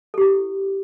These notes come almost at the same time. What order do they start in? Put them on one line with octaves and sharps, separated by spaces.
A4 G4 E4